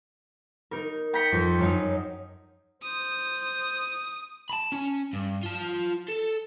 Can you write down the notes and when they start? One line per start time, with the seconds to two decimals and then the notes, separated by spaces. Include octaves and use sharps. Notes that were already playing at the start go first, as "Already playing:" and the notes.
0.71 D#4 A#4
1.13 G5 A#5 G6 A#6 B6 C#7
1.32 F2
1.59 F#2 F#3 D#4
2.83 C5 D#6
4.50 A5 B5
4.72 C#4
5.13 G2
5.43 F4 A5
6.08 A4